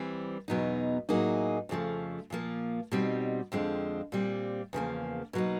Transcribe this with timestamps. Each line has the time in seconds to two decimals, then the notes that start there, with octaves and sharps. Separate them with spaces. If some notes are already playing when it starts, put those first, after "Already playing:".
Already playing: E3 G3 C4
0.48 E2 B2 F#3 B3 D#4
1.09 A2 F#3 A#3 D#4 G#4
1.69 F2 C#3 F3 A3
2.30 A#2 F3 A#3
2.92 B2 G3 C4 D#4
3.52 F2 D3 F3 G#3 C4
4.12 A#2 G3 C4
4.73 E2 C#3 F3 A#3
5.33 B2 F#3 A#3 D#4